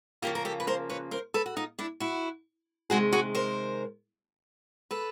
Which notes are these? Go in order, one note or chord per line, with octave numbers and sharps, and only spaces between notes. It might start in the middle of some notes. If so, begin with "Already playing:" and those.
C#3 F3 A#3 F4 G4
A#4
G4 A4
B4
A#4 C5
B4 C#5
A#4 C5
A4 B4
F#4
D#4 F4
D4 E4
E4 F#4
C3 D#3 G#3 F#4 G#4
F#4 G#4
A#4 C5
A4 B4